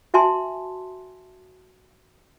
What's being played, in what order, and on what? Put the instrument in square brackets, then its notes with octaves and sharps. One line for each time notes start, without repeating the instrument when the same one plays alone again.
[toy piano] F#4 E5 G#5 A5 C6